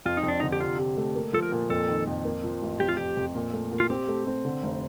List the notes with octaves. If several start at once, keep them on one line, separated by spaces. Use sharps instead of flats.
F2 F4
D#4
F2
D4
D#4
D3
G4
C3 F4
C3
A3
A#3
F3 A4
A#4
A#2
F2 A4
D#3
F2
A#3
F3
A1
F2 G4
F4
F2 G4
F2
A#2
A3
A#2
F4
C4 G4
A3
C4
D3
F1